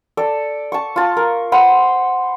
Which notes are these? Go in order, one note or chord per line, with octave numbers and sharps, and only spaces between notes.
A4 D5
A5 C#6
F4 A5
A#4
C5 F#5 B5 C6